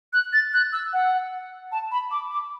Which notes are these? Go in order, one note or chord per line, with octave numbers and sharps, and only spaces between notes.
F#6
A6
F#6
E6
F#5
A5
B5
D6
D6